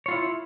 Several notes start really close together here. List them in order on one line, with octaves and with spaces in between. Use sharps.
C#5 F4 E4